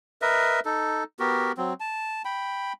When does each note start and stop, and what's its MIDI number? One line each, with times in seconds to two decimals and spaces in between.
0.22 0.60 70
0.22 0.60 71
0.22 0.60 75
0.22 0.60 76
0.65 1.04 63
0.65 1.04 69
1.20 1.52 59
1.20 1.52 66
1.20 1.52 67
1.20 1.52 70
1.58 1.73 54
1.58 1.73 60
1.80 2.22 81
2.25 2.73 79
2.25 2.73 83